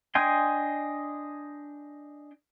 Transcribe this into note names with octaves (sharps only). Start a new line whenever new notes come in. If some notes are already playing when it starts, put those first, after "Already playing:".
D4 D#5 G5 G#5 C6